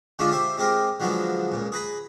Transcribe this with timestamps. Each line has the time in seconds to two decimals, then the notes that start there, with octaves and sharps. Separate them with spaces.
0.19 D3 G#3 C#4 D4 F4
0.31 G4 C5 E5
0.57 G#3 C4 G4 A#4
1.00 D3 F3 F#3 G#3 B3
1.52 C#2 A#2
1.72 G#4 B4 A#5 B5